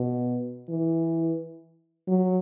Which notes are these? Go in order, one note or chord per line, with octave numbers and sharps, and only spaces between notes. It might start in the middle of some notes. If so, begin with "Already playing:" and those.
Already playing: B2
E3
F#3